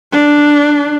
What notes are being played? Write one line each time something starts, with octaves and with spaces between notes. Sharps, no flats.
D4